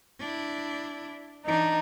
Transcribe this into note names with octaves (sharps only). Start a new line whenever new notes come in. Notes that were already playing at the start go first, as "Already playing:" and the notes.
D4 E4
E3 D4 D#4